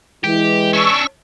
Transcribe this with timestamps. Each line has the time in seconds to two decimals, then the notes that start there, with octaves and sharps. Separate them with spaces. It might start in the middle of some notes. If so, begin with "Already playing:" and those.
0.24 E3 G#3 E4 G4
0.73 C#4 D4 C#6 E6